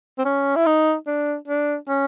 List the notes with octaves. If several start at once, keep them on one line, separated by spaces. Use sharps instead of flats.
C4
C#4
E4
D#4
D4
D4
C#4